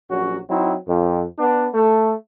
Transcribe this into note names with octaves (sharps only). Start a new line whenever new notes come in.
A#1 F#3 C#4 F#4
F#3 C4 D#4 E4
F2
B3 D4
A3